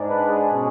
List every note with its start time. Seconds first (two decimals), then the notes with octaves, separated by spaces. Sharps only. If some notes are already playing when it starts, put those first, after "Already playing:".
Already playing: G#2 G#3 D4
0.09 B4
0.29 G#4
0.50 B2 G#3 C#4